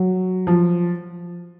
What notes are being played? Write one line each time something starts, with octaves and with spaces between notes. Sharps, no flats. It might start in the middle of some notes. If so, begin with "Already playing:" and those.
Already playing: F#3
F3